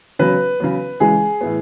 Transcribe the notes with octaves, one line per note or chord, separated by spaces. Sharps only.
C#3 F#3 B3 B4
C#3 F#3 B3
C#3 E3 G#3 G#4
A2 E3 B3